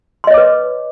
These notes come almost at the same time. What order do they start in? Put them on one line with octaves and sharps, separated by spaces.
C6 D#5 C#5 D6 B4